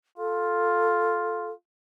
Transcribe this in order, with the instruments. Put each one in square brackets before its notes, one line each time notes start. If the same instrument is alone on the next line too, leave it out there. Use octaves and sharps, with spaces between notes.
[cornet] F4 [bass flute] A4